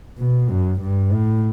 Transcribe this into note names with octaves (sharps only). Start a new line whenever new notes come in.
B2
F#2
G2
A2